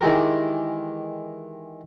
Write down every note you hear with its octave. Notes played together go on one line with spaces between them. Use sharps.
D#3 E3 G#3 G4 A#4